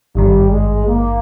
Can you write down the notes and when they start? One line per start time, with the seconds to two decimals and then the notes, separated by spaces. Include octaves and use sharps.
0.15 G#1 G2 D#3 G3
0.51 G#3
0.86 A#3